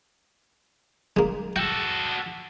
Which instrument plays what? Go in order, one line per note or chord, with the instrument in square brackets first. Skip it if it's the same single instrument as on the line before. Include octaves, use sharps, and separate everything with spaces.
[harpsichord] G#3 A#3
[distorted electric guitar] F#4 A4 [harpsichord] G5